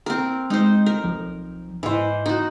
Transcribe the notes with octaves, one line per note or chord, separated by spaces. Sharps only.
C4 A#4
G#3 D#4 C5
A#4
B1 F3
G#2 E3 C5 D#5
D#4 F#4